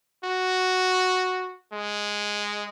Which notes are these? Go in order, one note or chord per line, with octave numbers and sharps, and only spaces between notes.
F#4
G#3